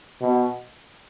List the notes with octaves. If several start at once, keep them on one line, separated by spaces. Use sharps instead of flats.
B2